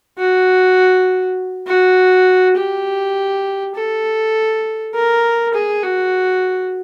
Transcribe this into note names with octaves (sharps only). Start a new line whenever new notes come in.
F#4
F#4
G4
A4
A#4
G#4
F#4